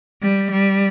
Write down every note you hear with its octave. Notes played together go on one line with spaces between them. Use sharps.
G3
G3